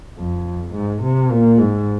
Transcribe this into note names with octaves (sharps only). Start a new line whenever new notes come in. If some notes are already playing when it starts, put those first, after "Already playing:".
F2
G#2
C3
A#2
G#2